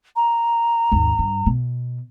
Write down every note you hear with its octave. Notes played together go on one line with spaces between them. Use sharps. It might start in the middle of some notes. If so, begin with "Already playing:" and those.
A#5
G#1 D#2
G2
B2